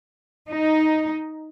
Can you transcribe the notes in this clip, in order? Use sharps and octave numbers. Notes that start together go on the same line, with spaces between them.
D#4